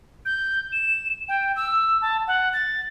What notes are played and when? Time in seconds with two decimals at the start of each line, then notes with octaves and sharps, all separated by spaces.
0.26 G6
0.72 E7
1.29 G5
1.56 E6
2.02 A5
2.27 F#5
2.53 A6